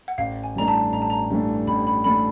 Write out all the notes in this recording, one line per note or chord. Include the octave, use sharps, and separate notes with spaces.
F#5
A1 F5
G#5
G2 E3 A3 D4 A#5
A5
A1 A#5
A5
A#5
G2 E3 A3 D4
A1 B5
B5
E3 A3 D4 B5